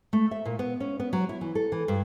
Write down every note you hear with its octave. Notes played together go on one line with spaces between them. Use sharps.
A3
E5
A#2
B3
C#4
B3
F#3
E4
E3
A4
E3
G2